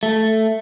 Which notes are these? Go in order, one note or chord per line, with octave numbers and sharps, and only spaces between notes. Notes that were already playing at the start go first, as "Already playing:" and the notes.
A3